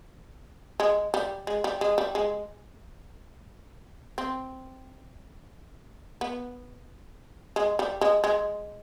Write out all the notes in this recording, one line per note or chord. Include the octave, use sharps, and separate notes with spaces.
G#3
G3
G#3
G3
G#3
G3
G#3
C4
B3
G#3
G3
G#3
G#3